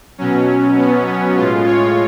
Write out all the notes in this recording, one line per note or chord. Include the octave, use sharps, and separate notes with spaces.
B2 F#3 C#4
B3
C#4
A2 G#3 F4
C#5